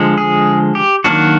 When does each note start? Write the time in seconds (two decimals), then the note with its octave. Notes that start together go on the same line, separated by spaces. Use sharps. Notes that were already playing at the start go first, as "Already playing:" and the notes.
Already playing: D3 F3 G#3
0.18 G#4
0.75 G4
1.04 D#3 F#3 A#3 D4 F#4